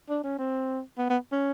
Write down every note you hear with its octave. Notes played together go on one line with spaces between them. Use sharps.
D4
C#4
C4
B3
B3
C#4